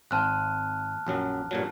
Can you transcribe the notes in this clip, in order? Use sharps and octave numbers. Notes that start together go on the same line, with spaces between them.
G#1 C4 A5 F6 F#6
A#1 F#2 F#3
G2 A#2 F#3